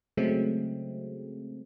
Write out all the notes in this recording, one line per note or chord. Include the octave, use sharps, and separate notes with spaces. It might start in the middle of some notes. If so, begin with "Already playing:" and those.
C#3 F#3 G#3 A3 C4